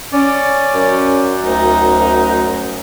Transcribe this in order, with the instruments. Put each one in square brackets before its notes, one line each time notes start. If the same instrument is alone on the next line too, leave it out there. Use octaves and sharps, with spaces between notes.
[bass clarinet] C#4 [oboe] D5
[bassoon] F#2
[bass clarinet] D2 [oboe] D#4